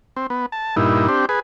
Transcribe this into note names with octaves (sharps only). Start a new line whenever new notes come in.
C4
B3
A5
G2 A#2 D#4 E4
C4 D4 G4
G#4 B4